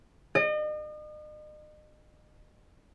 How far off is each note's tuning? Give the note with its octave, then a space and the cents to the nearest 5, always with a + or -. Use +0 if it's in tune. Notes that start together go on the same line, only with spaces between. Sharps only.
D#5 -40